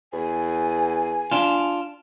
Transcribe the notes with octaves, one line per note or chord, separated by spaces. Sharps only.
E2 G#5
D4 F4